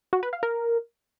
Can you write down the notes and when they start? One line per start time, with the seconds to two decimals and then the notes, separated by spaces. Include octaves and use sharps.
0.13 F#4
0.23 B4
0.33 F5
0.43 A#4